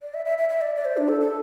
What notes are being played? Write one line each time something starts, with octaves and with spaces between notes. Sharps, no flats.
D5
E5
E5
E5
E5
D5
D5
C5
D4
A4
A4